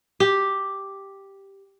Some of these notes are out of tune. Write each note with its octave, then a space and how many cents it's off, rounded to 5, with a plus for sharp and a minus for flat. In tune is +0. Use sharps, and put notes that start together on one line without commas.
G4 +0